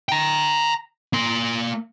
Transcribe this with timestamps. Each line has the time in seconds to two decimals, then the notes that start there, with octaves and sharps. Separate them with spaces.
0.09 G5 A#5
1.13 A#3 C6